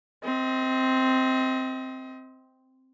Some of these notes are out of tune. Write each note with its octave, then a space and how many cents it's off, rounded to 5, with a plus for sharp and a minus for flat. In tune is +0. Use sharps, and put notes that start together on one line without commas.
C4 +0 D#5 +35